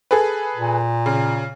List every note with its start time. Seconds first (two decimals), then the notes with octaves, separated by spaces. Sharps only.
0.11 G#4 A4 B4
0.56 A#2
1.06 C#3